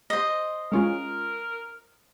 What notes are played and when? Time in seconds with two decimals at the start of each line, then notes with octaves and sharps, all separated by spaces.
0.10 C5 D#5
0.72 G#3 C#4 F4 A#4